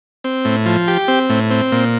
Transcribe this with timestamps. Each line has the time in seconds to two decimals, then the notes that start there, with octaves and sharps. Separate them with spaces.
0.24 C4
0.45 A2
0.66 F3
0.88 G4
1.08 C4
1.30 A2
1.50 C4
1.72 A#2